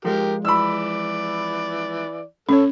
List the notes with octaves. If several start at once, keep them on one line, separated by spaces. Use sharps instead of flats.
F3 G#3 G4 A#4
E3 D5 B5 E6
A2 C#4 A4 C#5